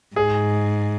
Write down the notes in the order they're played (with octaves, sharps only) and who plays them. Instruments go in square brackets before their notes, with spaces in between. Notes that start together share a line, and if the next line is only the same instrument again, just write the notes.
[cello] G#2 [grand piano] G#4